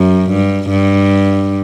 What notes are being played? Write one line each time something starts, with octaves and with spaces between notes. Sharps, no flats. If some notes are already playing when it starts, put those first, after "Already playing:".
Already playing: F#2
G2
G2